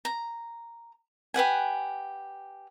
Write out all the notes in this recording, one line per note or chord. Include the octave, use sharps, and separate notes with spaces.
A#5
G4 B4 F#5 G#5